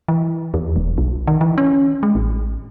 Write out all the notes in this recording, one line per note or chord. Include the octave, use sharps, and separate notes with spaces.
E3
E2
E1
B1
D#3
E3
C#4
G#3
A1